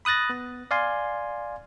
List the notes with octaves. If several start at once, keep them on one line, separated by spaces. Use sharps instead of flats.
B5 D#6 F#6 A6 A#6
B3
D5 F5 G#5 C6